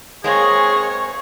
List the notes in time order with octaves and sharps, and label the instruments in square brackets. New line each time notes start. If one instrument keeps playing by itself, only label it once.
[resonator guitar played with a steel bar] G#3 A#3 C4 [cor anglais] G#4 [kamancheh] C#5 C#6